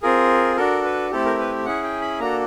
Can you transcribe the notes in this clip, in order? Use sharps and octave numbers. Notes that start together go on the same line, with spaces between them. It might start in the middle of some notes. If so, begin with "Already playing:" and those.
C4 F4 G#4 A#4
D4 F#4 A4 A#4
B4
A3 C4 E4 G4 A4
A#4
B4
C#4 E4 G#4 F#5
G5
B5
A#3 D4 F#4 A4 A#5